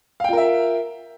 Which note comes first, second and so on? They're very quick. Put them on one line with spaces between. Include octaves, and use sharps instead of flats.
F5 G5 F4 A#4 E5